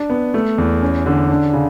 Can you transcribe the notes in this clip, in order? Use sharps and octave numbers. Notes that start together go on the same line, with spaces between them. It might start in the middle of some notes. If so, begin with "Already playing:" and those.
Already playing: D4
B3
A3
E2
C#4
D3
D4
C#3